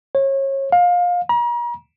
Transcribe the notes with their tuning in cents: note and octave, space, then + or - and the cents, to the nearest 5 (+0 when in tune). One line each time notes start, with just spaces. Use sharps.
C#5 -30
F5 +25
A#5 +40